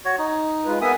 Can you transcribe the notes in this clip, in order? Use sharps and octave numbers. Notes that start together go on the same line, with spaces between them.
F#4 C#5
D#4
G#3 F4 B4
B3 A#4 E5 F#5 G#5 D#6